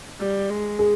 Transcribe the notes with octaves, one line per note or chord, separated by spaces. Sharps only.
G3
G#3
G#4